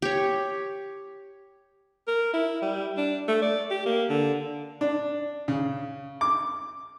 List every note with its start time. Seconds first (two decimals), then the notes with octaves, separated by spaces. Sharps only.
0.02 G4 C#5
2.07 A#4
2.33 E4
2.62 G3
2.97 D4
3.28 A3
3.42 D5
3.70 G4
3.86 A#3
4.10 D3
4.81 D4
5.48 C#3
6.21 D6